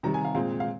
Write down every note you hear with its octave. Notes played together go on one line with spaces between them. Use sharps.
C3 D#3 G3 A#5
G#5
F5
A#2 G#3 C4 F5
F5